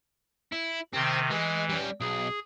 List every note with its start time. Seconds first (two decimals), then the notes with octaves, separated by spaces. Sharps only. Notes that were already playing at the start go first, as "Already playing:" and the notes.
0.52 E4
0.94 C3 D#3 C4
1.31 E3 G#3
1.69 G3 C#4
2.00 B1 G#4